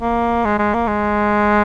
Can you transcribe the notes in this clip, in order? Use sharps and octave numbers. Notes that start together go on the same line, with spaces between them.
A#3
G#3
G#3
A#3
G#3